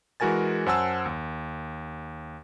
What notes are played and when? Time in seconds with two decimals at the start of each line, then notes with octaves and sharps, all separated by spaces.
0.20 E3 G#3 F#4 A#4 G#5 A6
0.66 F#2 C5 F#5 G#5 A5 E6
1.06 D#2